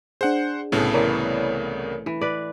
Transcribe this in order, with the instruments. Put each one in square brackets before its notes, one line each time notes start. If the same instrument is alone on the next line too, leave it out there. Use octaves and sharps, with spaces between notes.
[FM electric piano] D4 G#4 [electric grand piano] C5 F#5
[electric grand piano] C2 C#3 B3 [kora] A2 A4
[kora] E3 [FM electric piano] A#4 C#5 D5
[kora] E3
B4 D5